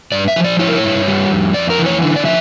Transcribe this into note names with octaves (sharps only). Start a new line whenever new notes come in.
G2 D5
E5
F3
D5
E4 C#5
A#4
C#5
G2
G3
F2
F2 D5
A#4
E3
C#5
D3
D5
F3 E5